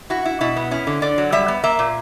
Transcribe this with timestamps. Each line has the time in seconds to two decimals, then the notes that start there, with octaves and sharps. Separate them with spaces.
0.10 E4 F#4
0.25 E4
0.41 B2 E4
0.56 B3
0.71 C#4 E4
0.87 D3
1.02 D3 D5
1.18 F#3
1.32 G3 E5
1.48 B3
1.64 A#3 E5
1.79 A#2